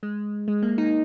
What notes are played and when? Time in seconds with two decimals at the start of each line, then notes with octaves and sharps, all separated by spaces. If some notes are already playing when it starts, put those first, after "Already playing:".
0.03 G#3
0.48 G#3
0.62 A#3
0.78 D#4